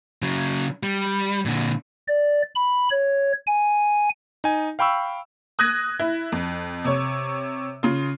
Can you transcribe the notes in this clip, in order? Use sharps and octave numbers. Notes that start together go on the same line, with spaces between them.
C#3 F#3
G3
A#2 D3
D5
B5
C#5
G#5
D#4 G#5
F5 G5 B5 C#6 E6
D#6 F#6 G#6 A#6 D#7
E4
F2
C3 C#5
C#3 F4